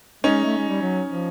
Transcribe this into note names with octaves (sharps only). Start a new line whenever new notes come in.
G#3 C#4 D#4
A3
G#3
G3
F#3
F3